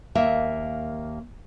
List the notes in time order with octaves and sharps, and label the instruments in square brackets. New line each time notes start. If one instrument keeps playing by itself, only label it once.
[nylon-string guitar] D#2 A#3 E5